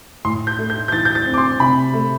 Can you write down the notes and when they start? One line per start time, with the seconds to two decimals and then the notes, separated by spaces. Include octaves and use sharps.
0.25 A2 C6
0.47 G6
0.58 A3
0.70 G6
0.88 G6
0.92 E3 A6
1.05 G6
1.15 A6
1.26 C4
1.34 D6
1.38 C6
1.60 C3 B5
1.94 A3